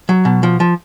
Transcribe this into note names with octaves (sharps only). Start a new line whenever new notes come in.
F#3
B2
F3
F3